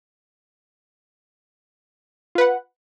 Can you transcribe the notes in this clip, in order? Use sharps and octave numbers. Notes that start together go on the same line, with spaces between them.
F4 B4 F#5